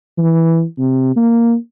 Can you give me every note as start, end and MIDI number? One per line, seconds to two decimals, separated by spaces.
0.18 0.63 52
0.79 1.12 48
1.16 1.56 58